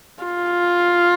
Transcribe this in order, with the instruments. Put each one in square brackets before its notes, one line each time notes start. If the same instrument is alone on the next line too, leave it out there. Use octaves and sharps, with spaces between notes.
[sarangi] F4